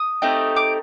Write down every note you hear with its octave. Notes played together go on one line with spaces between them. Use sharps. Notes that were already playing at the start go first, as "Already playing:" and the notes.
Already playing: D#6
A3 C4 D#4 G4
D6